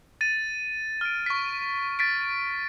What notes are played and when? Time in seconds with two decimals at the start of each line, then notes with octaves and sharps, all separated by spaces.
0.21 A6 D#7
1.01 F6 D7
1.26 C#6 B6
1.99 A6 B6 D7